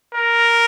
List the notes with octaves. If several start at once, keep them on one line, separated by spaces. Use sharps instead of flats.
A#4